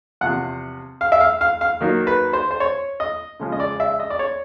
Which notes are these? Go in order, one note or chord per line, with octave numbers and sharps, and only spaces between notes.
E2 C3 F3 F#5
F5
E5
F5
F5
F5
D#3 F#3 A#3 D#4
B4
C5
C5
C#5
D#5
C#3 F3 G#3 C#4
D#5
D5
E5
D#5
D5
C#5